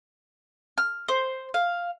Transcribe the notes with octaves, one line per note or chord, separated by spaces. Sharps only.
F6
C5
F5